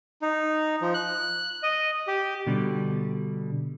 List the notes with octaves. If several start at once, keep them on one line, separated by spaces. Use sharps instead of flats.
D#4
F3
F#6
D#5
G4
B2 D3 G3